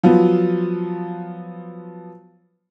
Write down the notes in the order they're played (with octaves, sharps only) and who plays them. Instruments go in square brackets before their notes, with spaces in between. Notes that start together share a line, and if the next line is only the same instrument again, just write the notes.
[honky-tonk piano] F3 F#3 B3 F4